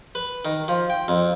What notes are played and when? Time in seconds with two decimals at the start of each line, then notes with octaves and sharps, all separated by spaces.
0.15 B4
0.45 D#3
0.68 F3
0.90 G5
1.08 F2